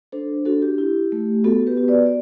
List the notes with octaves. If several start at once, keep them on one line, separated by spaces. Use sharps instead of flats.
D4 A4 C5
D4 F#4 A4
G4
E4
A3
B3 F#4 A4
G4 B4
F#4
B4 D5
D5